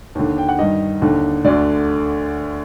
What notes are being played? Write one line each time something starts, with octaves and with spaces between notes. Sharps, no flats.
D#2 D3
G5
F#5
G2 D#3 D#5
D#2 D3
D2 D3 D5